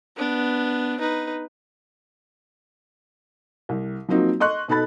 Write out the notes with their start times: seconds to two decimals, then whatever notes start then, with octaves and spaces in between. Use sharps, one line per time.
0.16 B3 D4
1.00 D#4 B4
3.69 C2
4.09 F3 F#3 A#3 C4 D#4 F#4
4.40 D#5 C6 C#6 F#6
4.68 B2 D#4 A4 B5 A6